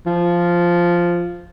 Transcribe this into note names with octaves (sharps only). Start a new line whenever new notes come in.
F3